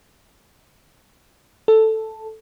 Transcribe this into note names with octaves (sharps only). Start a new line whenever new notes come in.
A4